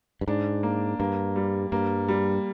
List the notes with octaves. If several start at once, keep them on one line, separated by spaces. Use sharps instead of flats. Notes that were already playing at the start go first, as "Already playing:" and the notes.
G2
G#2 D4
A#3
G2 A#3
G3
G2 A#3
G3